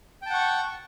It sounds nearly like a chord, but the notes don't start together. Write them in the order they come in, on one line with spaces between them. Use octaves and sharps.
G5 A5 F#5 C#6